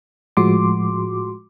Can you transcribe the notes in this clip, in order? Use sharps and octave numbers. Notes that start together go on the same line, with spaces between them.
A2 F3 G#3 F#4 C6 D6